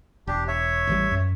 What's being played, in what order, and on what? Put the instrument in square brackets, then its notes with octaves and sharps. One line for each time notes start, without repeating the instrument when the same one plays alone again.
[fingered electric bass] E1 [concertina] D4 G4
[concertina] C#5 E5
[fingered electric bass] A1 E3 G3
F#2